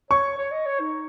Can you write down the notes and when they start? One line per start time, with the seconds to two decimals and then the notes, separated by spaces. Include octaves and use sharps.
0.11 C#5 C#6
0.38 C#5
0.51 D#5
0.66 C#5
0.80 D#4